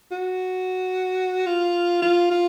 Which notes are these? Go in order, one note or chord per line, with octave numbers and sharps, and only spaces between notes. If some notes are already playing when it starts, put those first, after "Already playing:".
F#4
F4
F4
F4